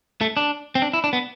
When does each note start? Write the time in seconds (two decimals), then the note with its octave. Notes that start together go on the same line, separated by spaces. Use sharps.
0.21 A3
0.37 D4
0.75 C4
0.82 D4
0.93 E4
1.04 D4
1.13 B3